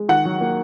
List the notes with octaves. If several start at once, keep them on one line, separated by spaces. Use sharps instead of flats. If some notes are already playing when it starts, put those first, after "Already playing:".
Already playing: G#3
D#3 F#5
F#3
A#3